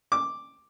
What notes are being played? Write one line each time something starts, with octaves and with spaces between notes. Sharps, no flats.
D6